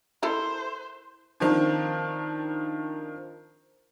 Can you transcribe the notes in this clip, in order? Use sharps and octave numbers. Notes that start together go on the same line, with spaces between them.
E4 A4 A#4 C5
D#3 F3 C4 D4